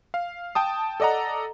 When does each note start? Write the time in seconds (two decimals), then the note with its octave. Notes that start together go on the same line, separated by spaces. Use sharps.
0.14 F5
0.55 G5 A5 D#6
1.00 A4 D5 D#5 F#5 A#5